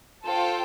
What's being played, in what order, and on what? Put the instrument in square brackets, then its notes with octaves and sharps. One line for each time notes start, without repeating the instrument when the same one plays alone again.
[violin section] F4 A4 C5 G5